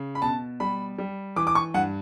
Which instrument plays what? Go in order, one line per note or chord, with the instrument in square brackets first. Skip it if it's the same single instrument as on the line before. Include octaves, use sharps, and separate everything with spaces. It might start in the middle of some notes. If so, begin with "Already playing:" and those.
Already playing: [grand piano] C#3
B5
B2 A5
G3 B5
G3
E3 D6
D6
C#6
G2 F#5